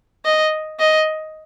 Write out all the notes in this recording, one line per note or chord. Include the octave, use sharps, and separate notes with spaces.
D#5
D#5